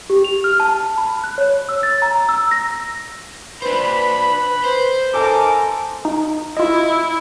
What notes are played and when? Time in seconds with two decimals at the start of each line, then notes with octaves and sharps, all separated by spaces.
0.10 G4
0.24 F7
0.44 F6
0.60 A5
0.98 B5
1.24 F#6
1.38 C#5
1.69 E6
1.83 A6
2.02 A#5
2.29 E6
2.51 A#6
3.62 D4 B4 C5 B5
4.64 C5
5.14 D#4 A4 A#4 G#5 A5 D6
6.05 D#4
6.57 E4 F4 D#5